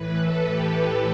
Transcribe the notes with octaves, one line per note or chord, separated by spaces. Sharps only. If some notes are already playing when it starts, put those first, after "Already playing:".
Already playing: A2 E3 B4
A4
G4